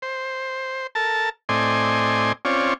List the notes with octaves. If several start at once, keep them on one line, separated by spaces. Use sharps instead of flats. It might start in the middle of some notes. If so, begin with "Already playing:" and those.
C5
A4 A#4 A5
A2 C4 D5 D#5 G#5 C6
C4 C#4 F4 C#5 D5